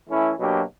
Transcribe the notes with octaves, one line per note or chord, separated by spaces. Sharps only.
E3 A3 C#4 E4
B2 F#3 A#3 D4 G4